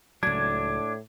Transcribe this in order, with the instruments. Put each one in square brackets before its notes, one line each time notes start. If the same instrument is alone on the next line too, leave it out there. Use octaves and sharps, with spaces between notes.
[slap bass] C#2 F#3 [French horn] A2 [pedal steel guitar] D4 [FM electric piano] G#6